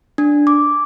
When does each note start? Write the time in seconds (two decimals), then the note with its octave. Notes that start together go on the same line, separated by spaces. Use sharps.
0.18 D4
0.47 D6